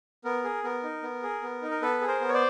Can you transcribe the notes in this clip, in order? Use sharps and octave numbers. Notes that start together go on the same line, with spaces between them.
B3 A#4
G#4
B3 A#4
D#4
B3
G#4
B3
D#4
A#4
B3 A4 B4
G#4
A#4 C5
B3
C#5
C5 D5